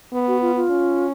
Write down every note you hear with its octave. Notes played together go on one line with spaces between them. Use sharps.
B3
F#4
F4
F4
C#4